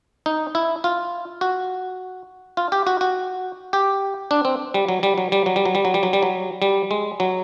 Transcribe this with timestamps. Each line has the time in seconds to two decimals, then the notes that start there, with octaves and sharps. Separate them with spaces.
0.26 D#4
0.55 E4
0.84 F4
1.41 F#4
2.57 F4
2.72 G4
2.87 F#4
3.01 F#4
3.73 G4
4.31 D4
4.45 C4
4.74 G3
4.88 F#3
5.03 G3
5.18 F#3
5.32 G3
5.46 F#3
5.56 G3
5.65 F#3
5.75 G3
5.85 F#3
5.94 G3
6.03 F#3
6.13 G3
6.23 F#3
6.62 G3
6.91 G#3
7.20 F#3